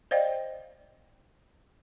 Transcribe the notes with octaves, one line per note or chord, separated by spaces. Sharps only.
C5 D5 D#5 F5 G5